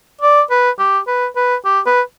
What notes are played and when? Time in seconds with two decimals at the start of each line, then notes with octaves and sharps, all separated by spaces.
0.21 D5
0.50 B4
0.79 G4
1.07 B4
1.36 B4
1.65 G4
1.86 B4